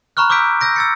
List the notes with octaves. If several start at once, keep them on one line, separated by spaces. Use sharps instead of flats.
A#5 B5 C#6 F6 F#6
C#6 D6 E6 G6 B6 D7
E6 G6 A#6 D7
E6 A6 C#7